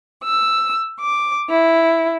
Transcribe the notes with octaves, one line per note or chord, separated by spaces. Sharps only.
E6
D6
E4